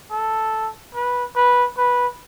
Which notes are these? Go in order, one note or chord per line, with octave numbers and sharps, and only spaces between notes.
A4
B4
B4
B4